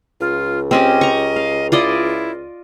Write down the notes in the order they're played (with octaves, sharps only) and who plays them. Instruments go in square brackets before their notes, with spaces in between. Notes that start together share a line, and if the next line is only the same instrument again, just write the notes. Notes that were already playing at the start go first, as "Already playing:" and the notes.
[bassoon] C#2 [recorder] F4
[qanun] C4 C#4 G4 [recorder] D#5
[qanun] A#5 C#6
F5
[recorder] E4 [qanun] F4 D5 D#5